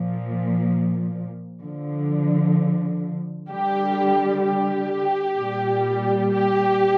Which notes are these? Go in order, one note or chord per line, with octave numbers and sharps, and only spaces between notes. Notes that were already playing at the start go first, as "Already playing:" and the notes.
Already playing: A#2 F3
D3 F3
D3 G3 G4
G4
A#2 G3
G4